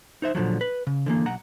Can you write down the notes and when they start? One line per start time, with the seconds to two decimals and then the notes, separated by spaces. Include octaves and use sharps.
0.22 D#4 C5 E5
0.35 A#2 D3 F3 F#3
0.61 B4
0.87 C#3
1.06 D3 E3 A#3
1.26 B1 F#5 A#5